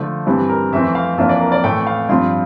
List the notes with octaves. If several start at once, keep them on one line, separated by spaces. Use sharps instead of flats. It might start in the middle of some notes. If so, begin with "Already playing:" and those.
Already playing: D3 F3 A3
G2 E3 G3 C4 A4
A#4
F2 E3 A3 C4 E5
F5
F2 E3 A#3 D4 F4 E5
D5
A#4
D5
A2 E3 A3 G5
F5
G2 F3 C4 F4 C6